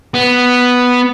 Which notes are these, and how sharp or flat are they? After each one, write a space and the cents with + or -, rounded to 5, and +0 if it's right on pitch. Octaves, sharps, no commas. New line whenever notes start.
B3 +0